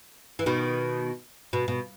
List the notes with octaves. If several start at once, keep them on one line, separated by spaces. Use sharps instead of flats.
E3
B2 D#3
B2
B2